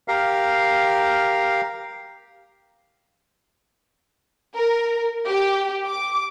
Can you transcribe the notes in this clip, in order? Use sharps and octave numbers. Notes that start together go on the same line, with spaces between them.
G4 A#4 F5
A#4
G4
D6